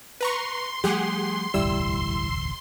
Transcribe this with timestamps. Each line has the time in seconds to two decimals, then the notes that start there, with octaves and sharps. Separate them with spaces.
0.21 B4 A#5 C6 C#6
0.84 F3 G3 A3 G4 G#4 F#5
1.54 E1 A1 D2 G3 E4 E6